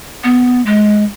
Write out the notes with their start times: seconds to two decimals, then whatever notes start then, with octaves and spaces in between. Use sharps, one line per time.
0.24 B3
0.66 G#3